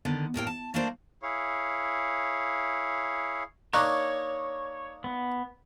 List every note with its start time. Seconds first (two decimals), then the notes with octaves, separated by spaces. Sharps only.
0.05 D3 D#3 B3
0.34 D#2 A2 A#4 G5
0.47 A5
0.74 A3 A#3 D4 A#4 C5 D5
1.23 E4 G#4 C#5 F5
3.74 A#3 D4 D#4 C#5 A#5 C#6 F#6
5.04 B3